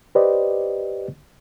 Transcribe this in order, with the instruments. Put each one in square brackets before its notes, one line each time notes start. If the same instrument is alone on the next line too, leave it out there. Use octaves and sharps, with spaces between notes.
[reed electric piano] G4 B4 C5 D5 D#5